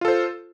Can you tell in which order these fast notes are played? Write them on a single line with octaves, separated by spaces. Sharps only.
F4 A4 C5